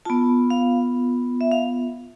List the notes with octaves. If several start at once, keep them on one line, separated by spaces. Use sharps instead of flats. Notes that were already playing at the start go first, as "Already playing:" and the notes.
B3 F4 A5
F5
E5
F5